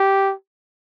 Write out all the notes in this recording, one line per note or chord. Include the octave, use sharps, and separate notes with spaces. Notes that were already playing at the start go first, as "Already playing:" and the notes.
Already playing: G4